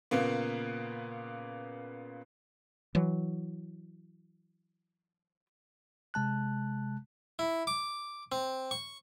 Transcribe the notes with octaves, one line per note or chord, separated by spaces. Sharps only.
A#2 C#3 A#3 B3
E3 F#3
C3 G#3 A5 F#6
E4
D6
C4
C#6